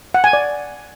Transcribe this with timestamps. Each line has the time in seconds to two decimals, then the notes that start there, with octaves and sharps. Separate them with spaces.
0.14 F#5
0.24 G#5
0.33 D5